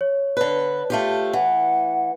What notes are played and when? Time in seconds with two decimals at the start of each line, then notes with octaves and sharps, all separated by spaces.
0.01 C#5
0.37 D3 B4
0.90 A3 F4 G4
1.33 E3 F#5